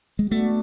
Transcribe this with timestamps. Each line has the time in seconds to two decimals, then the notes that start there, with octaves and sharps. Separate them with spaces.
0.19 G#3
0.31 A3 B3 D4 F#4